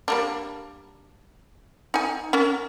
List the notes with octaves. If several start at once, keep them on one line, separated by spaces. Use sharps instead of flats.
G3 A#3 D4
D#4 G#5
C#4 A#4